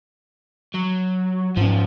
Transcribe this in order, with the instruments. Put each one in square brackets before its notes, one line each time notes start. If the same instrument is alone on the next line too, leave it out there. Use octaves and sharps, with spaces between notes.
[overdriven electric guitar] F#3
[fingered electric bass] G#2 C#4 [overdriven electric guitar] F3